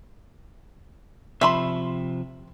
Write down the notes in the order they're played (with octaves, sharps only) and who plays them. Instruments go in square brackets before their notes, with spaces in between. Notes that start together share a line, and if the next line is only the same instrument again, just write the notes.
[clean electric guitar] C3 F3 [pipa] E5 B5 C6